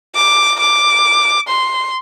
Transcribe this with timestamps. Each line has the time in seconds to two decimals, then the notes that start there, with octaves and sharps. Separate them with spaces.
0.15 D6
0.60 D6
1.48 C6